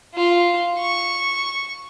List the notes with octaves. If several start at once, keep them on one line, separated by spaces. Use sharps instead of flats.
F4
C#6